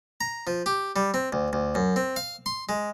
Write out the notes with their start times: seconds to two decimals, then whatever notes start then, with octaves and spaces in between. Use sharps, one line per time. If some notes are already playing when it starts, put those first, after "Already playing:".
0.21 A#5
0.47 F3
0.66 G4
0.96 G3
1.14 C4
1.33 D2
1.53 D2
1.75 F#2
1.96 C4
2.16 F5
2.46 C6
2.69 G#3